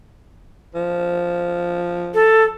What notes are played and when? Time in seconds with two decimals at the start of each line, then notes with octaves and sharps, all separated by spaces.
0.75 F3
2.14 A4